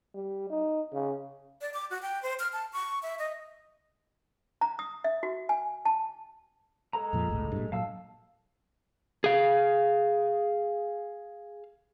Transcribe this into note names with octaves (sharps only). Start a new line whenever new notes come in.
G3
D#4
C#3
D5
D6
F#4
G5
C5
F6
A5
C#6
E5
D#5
A#5
D#6
E5
F#4
G#5
A5
G#3 A4 A#5
F2 A#2 F3
G1 C#2 A2
G2 A#2
A#2 F#3 F5 A5 E6
G#4 F5